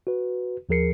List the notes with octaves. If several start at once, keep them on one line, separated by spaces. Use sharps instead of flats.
F#4 B4
D#2 F3 G#4 A#4 C7 C#7